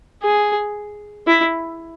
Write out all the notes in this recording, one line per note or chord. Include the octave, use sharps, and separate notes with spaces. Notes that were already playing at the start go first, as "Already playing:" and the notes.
G#4
E4